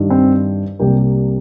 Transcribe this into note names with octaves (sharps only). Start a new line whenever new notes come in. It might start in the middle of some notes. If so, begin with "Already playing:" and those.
Already playing: G2 D#3
C4
C2 C3 G3 A#3 G4